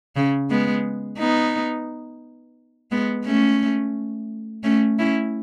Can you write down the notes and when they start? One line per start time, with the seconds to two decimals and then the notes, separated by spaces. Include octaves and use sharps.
0.16 C#3
0.50 G#3 B3
1.19 B3 D#4
2.91 G#3 B3
3.26 A3 C#4
4.64 A3 C#4
4.99 C#4 E4